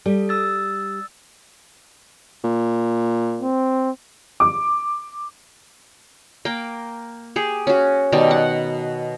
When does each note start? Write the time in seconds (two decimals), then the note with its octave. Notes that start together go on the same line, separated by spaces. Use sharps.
0.06 G3 A4
0.29 D#6 E6 A6
2.44 A#2
3.41 C4
4.40 D6
6.45 A#3 G5
7.36 G4 G#4
7.67 C#4 F#4
8.12 B2 D#3 G3
8.31 F#5